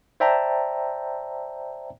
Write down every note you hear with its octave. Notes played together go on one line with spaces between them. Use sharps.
C5 D5 E5 G5 A5 A#5